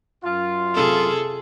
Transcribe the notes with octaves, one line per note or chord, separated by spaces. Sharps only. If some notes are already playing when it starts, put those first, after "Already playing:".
F#2 F4
C3 G#4 A4